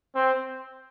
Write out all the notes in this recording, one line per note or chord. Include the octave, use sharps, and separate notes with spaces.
C4